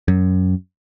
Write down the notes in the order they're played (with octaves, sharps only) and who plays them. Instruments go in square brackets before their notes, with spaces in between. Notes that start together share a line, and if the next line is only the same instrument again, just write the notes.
[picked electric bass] F#2